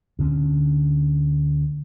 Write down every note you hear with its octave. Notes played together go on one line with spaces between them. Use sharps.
D2 D3 B3 C#4